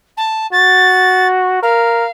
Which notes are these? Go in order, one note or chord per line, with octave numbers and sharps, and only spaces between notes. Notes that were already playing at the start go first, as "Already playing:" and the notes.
A5
F#4 A6
A#4 F5